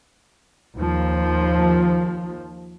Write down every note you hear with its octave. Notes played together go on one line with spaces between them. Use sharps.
D#2 F3